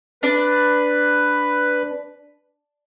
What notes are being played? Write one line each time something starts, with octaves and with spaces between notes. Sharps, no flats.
D4 B4